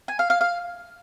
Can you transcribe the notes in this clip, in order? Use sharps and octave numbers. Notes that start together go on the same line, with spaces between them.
G#5
F5
F5
F5